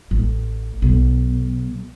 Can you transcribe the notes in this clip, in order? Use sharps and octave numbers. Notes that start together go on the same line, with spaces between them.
A1
B1